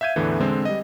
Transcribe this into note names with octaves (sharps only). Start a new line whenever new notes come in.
E5 F5 G6 G#6 D#7
E2 A2 D3 E3
D3 G#3 C4
G3 D#5